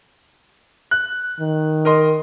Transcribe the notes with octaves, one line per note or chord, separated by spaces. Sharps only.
F#6
D#3
A#4 D#5 C6